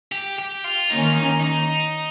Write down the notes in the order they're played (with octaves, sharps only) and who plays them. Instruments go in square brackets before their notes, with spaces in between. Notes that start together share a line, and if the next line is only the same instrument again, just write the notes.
[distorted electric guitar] G4
G4
F4
[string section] D#3 A#3 C#4 [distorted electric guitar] D#4
[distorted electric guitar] F4
D#4
D#4